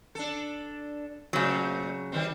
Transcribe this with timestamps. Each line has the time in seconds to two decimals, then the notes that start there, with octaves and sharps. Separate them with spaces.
0.15 D4 A4
1.33 A#2 C#3 F#3 A3 C4
2.12 D#3 G3 C4